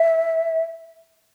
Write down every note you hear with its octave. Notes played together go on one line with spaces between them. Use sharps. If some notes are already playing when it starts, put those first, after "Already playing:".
Already playing: E5